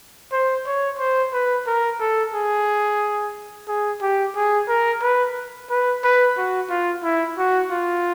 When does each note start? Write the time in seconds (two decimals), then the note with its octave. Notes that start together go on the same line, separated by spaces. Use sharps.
0.32 C5
0.66 C#5
0.99 C5
1.33 B4
1.67 A#4
2.00 A4
2.34 G#4
3.68 G#4
4.02 G4
4.36 G#4
4.68 A#4
5.02 B4
5.70 B4
6.04 B4
6.37 F#4
6.70 F4
7.04 E4
7.38 F#4
7.71 F4